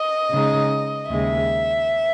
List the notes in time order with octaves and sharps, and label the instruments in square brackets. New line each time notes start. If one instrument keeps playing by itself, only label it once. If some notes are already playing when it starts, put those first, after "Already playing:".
Already playing: [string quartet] D#5
C#3 G#3 D#4
D#2 C#3 G#3 E5